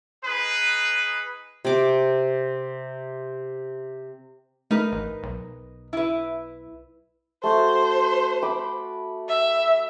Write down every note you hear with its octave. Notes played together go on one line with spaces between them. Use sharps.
D#4 G#4 B4
C3 D6
A3 D#4 A#4 B4
A1
B1
E4 B4
A3 F#4 C5
B5 D6
E5